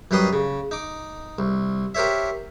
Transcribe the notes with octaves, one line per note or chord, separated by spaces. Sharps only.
F#2 F#3 G3 B4 C6 D#6
C#3
D#4 D6
C2
G4 A#4 C5 C#5 E5